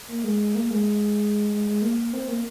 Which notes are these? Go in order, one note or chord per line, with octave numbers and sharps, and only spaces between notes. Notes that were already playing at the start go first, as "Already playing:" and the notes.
A#3
G#3
A#3
G#3
G#3
G#3
A#3
C4
A#3